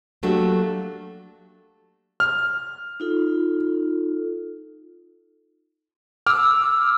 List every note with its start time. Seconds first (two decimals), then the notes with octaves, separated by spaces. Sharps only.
0.23 F#3 A3 A#3 D4 F#4 G4
2.20 F6
3.00 D#4 F4 A4
6.27 D6 E6 F6